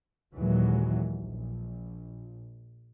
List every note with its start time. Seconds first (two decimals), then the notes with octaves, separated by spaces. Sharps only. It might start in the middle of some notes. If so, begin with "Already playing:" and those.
0.36 D#2 A#2 E3 F#3 G#3
1.20 A#1